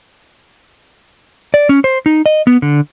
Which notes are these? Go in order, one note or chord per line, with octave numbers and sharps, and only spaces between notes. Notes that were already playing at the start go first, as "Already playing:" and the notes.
D5
C#4
C5
D#4
D#5
B3
D3